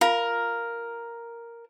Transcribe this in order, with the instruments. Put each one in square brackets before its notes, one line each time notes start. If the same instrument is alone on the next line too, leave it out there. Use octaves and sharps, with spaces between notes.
[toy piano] F4 F5 [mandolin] A#4